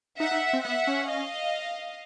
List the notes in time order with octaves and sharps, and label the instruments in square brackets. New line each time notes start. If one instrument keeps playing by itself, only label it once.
[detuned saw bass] D#4 [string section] E5 F#5
[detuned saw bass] D#4
C4
[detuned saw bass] B3 [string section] E5 F#5
[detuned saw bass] C#4
[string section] D#5 F5